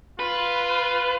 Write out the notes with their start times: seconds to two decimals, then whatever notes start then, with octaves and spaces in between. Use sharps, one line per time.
0.19 F4 B4